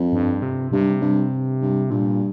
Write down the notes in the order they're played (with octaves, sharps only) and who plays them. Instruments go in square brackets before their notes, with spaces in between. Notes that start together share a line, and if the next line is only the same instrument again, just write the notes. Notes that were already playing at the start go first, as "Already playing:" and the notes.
Already playing: [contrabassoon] F2
[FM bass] G2
C3
[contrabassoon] G2 [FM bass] C3
[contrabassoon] G2
G2
[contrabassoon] G2 [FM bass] A#2